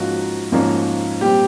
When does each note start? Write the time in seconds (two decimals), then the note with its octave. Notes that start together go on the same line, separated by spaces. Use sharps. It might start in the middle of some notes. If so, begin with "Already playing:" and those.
Already playing: G#2 F3 A#3 C#4 F#4
0.52 G#2 F3 A#3 C#4
1.21 A#2 G3 C4 G4